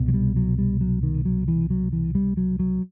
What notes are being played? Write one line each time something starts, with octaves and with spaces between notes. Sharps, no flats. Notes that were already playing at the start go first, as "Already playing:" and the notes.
Already playing: C2 B2
F#3
G3
F#3
G3
F#3
D#3
F#3
E3
F#3
E3
G3
F#3
F#3